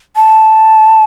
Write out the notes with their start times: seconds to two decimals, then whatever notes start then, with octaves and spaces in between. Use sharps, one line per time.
0.16 A5